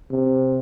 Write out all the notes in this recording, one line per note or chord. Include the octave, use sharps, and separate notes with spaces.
C3